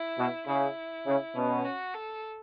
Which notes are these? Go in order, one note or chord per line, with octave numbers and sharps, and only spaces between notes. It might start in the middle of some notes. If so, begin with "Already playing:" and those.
Already playing: E4
B2
C#3 E4
C#3
B2 C#4
F#4
A4